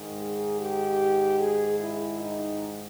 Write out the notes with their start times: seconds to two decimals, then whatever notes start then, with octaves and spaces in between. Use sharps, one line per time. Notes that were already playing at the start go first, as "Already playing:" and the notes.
Already playing: G#2 D#3
0.21 G#4
0.60 G4
1.40 G#4
1.80 E4
2.21 D#4